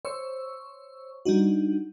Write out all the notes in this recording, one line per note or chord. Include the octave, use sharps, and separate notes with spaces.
C5 C#5 C#6 E6
G3 D4 D#4 F#4